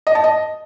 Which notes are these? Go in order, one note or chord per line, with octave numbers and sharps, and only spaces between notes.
D#5
A5
D#5